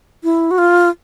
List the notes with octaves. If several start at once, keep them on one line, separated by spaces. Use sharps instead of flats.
E4
F#4
F4